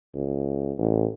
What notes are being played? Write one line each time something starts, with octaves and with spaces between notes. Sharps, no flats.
C#2
A1